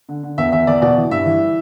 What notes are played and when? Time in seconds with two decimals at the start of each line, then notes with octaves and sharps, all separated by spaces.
0.09 D3
0.23 D3
0.38 E2 E5
0.52 E2 E5
0.67 E2 D5
0.82 B2 D5
0.97 E3
1.11 G2 E5
1.26 E3